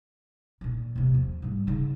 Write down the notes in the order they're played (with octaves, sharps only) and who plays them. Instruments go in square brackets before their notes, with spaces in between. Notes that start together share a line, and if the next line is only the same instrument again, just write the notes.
[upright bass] A#2 D#3
D#2 C3
F3
G#2 G3
C#3 D#4